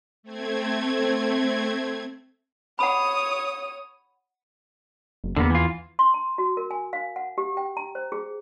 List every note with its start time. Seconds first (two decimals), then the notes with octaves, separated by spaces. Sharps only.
0.23 A3 C4 G#6
2.79 C#5 F#5 B5 D#6
5.24 F#1
5.36 E2 D3 A#3 B3
5.50 E3 F4
5.99 C6
6.14 A#5
6.38 F#4
6.57 A#4
6.71 G#5
6.93 F5
7.16 F#5
7.38 G4
7.57 G5
7.77 A#5
7.95 C5
8.12 G#4